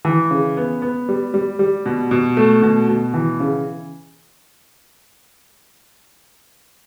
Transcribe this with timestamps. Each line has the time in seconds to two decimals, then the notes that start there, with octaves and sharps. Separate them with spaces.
0.05 E3
0.31 C#3
0.57 B3
0.82 B3
1.09 G3
1.34 G3
1.59 G3
1.86 B2
2.11 B2
2.37 A3
2.62 B2
2.88 B2
3.14 E3
3.40 C#3